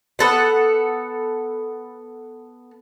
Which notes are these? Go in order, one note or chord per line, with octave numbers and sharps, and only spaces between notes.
B3 A4 F#5